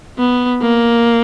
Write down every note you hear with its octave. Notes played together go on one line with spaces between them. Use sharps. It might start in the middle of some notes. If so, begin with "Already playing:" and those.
B3
A#3